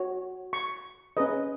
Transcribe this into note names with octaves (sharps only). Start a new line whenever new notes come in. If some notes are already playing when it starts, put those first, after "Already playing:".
Already playing: F#4 C#5
C#6
C#4 G#4 B4 D#5